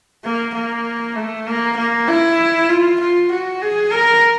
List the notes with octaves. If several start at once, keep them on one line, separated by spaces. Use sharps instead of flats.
A#3
A#3
A3
A#3
A#3
E4
F4
F4
F#4
G#4
A#4